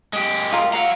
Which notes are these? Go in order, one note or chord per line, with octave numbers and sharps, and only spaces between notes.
G#3 G4
F4 A#4
F5 F#5 A#5